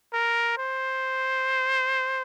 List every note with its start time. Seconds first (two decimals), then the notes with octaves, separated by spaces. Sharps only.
0.13 A#4
0.58 C5